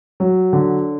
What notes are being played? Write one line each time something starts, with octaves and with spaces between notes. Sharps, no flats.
F#3
D3